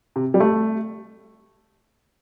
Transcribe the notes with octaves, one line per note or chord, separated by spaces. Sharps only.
C3
G3
A3